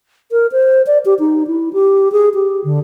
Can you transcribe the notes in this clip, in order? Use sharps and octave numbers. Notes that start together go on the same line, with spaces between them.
A#4
C5
D5
G4
D#4
E4
G4
G#4
G4
D3